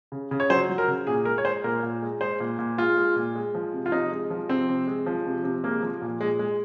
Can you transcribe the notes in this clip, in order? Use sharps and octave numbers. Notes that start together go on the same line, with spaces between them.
C#3
C#3
C#5
F#3 C5
F#3
A#4
C#3
A#2 G#4
G#3 A#4
C#5
G#3 C5
A#2 A#4
A#2
G#3
G#3 C5
A#2
A#2
G#3 F4
G#3
A#2
G#3
F3
C3
F4
C3 D#4
G#3
F3
C3 C4
C3
G#3
F3
C3
C3
G#3 A#3
F3
A#2
A#2 G#3
G#3